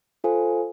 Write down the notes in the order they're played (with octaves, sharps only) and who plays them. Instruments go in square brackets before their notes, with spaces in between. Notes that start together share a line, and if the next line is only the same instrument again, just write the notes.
[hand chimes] F4 A4 C5 F5 G#5